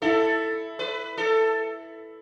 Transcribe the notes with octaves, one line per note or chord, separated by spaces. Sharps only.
E4 A4
B4
A4